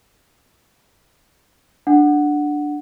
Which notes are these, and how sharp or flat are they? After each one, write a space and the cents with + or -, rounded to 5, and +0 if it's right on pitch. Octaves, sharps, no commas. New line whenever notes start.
D4 +5 F#5 +0